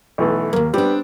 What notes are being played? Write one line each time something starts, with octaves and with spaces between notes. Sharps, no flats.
B1 E3 A3
D#2 G#2 A#3
G3 B3 C4 D4